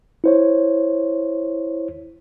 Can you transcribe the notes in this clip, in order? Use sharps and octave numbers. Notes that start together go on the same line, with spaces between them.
E4 C5 C#5